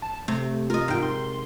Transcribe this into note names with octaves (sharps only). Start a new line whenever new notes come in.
A5
C3 A3
F4 A#4 D#5
G#2 G5
C6